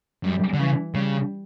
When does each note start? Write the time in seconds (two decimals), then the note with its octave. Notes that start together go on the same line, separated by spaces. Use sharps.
0.24 F#2 G3
0.54 D3
0.59 C#3 E3
0.94 C#3 G3